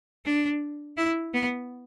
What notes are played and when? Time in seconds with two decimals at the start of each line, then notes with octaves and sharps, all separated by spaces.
0.25 D4
0.97 E4
1.34 B3